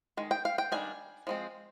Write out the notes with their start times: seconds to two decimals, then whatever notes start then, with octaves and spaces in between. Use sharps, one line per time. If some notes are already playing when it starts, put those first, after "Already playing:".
0.17 D#3 G#3
0.31 G5
0.45 F5
0.58 G5
0.72 D#3 G3 D4 G#5
1.27 F3 G#3 C4